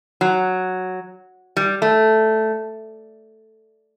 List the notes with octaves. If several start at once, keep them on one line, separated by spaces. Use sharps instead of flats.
F#3
G3
A3